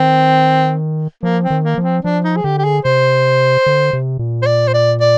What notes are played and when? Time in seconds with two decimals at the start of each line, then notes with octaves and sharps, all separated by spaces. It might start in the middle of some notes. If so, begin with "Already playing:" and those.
Already playing: D#3 C4
1.23 F3 A#3
1.44 C4
1.50 D#3
1.64 A#3
1.78 F3
1.83 C4
2.04 F3 D4
2.24 D#4
2.36 G#4
2.44 D3 G4
2.58 G4
2.64 G#4
2.84 C3 C5
3.66 D3
3.93 C3
4.19 A#2
4.42 C5
4.46 D5
4.68 C5
4.74 D5
5.00 D5